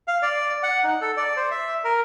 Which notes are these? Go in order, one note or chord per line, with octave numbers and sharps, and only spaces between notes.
F5
D5
F#5
D#4
A4
D5
C5
E5
A#4